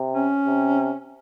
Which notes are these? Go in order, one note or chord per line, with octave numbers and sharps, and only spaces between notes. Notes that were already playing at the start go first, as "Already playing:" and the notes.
Already playing: C3
C#4
C3